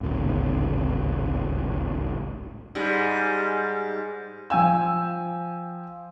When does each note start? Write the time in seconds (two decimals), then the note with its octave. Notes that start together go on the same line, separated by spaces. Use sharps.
0.01 D1 G#1 C#2
2.75 G#2 G3 G#3
4.50 F3 G5 G#5 E6